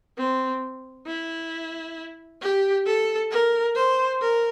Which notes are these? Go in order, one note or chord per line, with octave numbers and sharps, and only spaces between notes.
C4
E4
G4
A4
A#4
C5
A#4